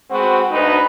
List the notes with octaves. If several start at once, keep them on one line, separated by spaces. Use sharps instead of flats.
G#3 B3 C4 F#4
D2 D#4 B4